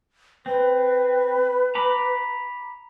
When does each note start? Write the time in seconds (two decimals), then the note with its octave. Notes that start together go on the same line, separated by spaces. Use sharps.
0.46 C4 B4
1.75 A#5 B5 D6